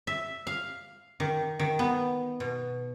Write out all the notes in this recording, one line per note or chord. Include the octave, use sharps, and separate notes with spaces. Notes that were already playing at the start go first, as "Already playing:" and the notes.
E5
F5
D#3
D#3
B3
B2